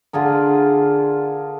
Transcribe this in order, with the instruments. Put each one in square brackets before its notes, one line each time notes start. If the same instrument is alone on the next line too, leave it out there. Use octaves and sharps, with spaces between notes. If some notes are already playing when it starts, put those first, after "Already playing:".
[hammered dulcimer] D3 F4 G#4 A#4